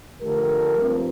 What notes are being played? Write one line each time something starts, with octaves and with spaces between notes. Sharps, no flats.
D3 F3 A3 G4 A#4
G2 F3 C4